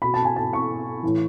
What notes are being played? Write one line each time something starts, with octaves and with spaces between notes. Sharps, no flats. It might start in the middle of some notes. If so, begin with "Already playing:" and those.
B2 B5
A5
G#5
A5
C#6
A2 E3